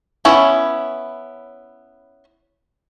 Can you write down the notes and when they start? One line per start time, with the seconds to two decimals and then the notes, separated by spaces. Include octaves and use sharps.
0.25 B3 C#4 E4 C#5